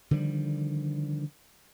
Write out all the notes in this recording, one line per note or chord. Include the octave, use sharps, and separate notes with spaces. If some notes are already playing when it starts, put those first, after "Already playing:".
D3 D#3 F3 G3